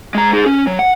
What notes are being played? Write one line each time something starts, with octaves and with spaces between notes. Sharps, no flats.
G#3 A#5
D#4 G#4
C#4
F#3
F#5